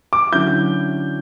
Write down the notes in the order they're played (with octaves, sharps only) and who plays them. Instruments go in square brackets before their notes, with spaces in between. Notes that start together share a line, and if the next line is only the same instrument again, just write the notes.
[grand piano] D6
D3 F#3 C#4 E4 G6